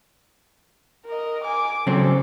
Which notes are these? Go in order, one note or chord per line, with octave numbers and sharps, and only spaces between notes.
A#4 D#5
G#5 D6
C#3 F#3 C4 A4